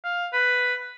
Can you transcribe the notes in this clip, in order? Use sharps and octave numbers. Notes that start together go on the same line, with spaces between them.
F5
B4